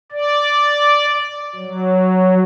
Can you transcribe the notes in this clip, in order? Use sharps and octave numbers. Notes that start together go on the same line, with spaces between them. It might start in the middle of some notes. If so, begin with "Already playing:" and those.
D5
F#3